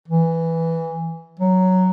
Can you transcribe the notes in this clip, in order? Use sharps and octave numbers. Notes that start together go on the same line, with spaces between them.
E3
F#3